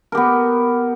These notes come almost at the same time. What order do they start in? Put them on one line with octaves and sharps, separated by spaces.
A#4 G4 B3